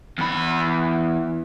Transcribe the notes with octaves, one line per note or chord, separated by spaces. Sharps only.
E2 B5